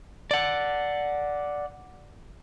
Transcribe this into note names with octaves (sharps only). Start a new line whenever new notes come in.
D5 F#5